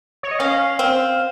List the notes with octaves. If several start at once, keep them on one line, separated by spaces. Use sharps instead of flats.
C#5
D#5
C#4 F5
C4